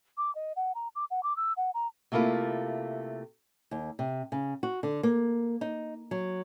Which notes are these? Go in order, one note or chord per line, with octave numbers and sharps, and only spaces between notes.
D6
D#5
F#5
A#5
D6
F#5
D6
E6
F#5
A#5
C3 A3 A#3 E4 F4
D#2
C3
C#3
F#4
D3
A#3
D#4
F#3